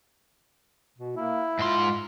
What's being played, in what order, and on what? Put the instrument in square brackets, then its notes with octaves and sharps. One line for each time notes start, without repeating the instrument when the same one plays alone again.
[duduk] B2
[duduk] A#3 [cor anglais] E4
[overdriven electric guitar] G#2 C6 [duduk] F4